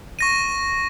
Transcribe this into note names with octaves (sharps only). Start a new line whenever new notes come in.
C#6 A#6 D#7